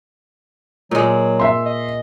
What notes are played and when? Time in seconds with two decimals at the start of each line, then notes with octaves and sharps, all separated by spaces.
0.91 A#2 F#3 G#3
1.39 E5 C6
1.65 D#5